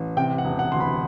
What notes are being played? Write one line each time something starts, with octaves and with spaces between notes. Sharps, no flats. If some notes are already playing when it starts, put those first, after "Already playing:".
Already playing: A1
C3 G5
F#5
E1
F#5
D2 C6
B5